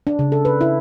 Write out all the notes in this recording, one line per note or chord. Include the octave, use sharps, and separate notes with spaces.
D4
C#3
A4
B4
E4